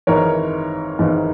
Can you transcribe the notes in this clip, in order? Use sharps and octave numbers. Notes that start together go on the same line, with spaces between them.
G#1 G#2 E3 A#4 C#5
G#1 G#2 E3